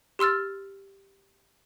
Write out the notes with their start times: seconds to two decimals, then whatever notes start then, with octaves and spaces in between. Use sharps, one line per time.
0.19 G4 C6 E6 F6 A6